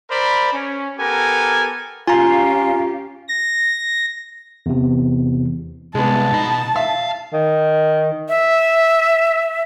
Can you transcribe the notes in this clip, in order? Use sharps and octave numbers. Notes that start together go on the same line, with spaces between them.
A#4 C5 D5 B5
C#4
B3 G4 A4 A#4 G#5
C#4 F4 G4 F5 G#5 A#5
A#6
E2 C3
C2 G#3 B3 A5
B2 D#4 B5
E5 F5
D#3
E5